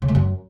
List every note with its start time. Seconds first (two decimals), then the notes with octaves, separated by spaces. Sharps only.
0.02 C#3
0.08 A3
0.15 F#2